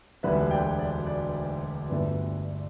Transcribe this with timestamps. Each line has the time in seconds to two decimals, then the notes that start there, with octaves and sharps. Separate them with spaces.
0.23 E1 D2 D3 G3 B4 E5
0.51 D5 G5
0.79 D5
1.07 D5
1.90 G1 G2 D3 A3 B4 E5